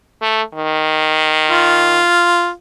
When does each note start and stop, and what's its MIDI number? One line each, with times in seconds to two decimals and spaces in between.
0.21 0.42 57
0.54 2.02 51
1.51 2.51 65